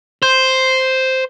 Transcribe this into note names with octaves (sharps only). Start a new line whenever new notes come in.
C5